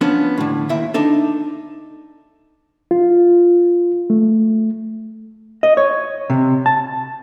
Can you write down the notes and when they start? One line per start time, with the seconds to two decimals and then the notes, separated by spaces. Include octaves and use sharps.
0.01 F3 B3 C#4 D4
0.38 A2 D3
0.69 D#2 A#2 E4 E5
0.94 D4 D#4 A4
2.91 F4
4.10 A3
5.63 D#5
5.77 C#5
6.30 C3
6.66 A5